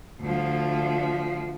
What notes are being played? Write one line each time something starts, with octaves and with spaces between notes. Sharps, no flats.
D2 F3